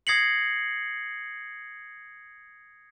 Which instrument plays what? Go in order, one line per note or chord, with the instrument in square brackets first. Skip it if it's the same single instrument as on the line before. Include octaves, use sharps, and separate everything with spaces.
[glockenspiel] D#6 G#6 A#6 C7 C#7 F#7